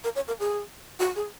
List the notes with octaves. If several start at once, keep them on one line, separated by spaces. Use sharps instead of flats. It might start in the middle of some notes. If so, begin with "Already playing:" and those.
A#4
C#5
A#4
G#4
F#4
G#4